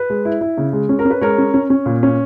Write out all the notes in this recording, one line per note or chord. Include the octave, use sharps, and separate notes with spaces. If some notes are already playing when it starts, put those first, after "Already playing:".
Already playing: B4
G#3
E4
E4
C#3
G#3
C#4
A#4
C#4
B4
G#3 A#4 C#5
C#4
C#4
C#4
A#2
C#4